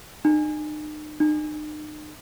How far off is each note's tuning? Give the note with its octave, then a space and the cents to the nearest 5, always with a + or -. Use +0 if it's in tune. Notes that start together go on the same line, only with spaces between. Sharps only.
D#4 -40
D#4 -40